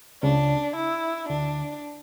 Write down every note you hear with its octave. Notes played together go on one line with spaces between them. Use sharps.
C#2 C#3 D4
E4
D2 D3 D4